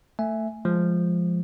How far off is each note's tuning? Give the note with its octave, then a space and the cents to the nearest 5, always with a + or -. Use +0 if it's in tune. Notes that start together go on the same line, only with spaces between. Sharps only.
A3 +15 E5 +0 G#5 +0
F3 +0 G#3 +0